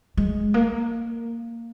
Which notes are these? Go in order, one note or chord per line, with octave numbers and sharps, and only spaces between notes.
G#3
A#3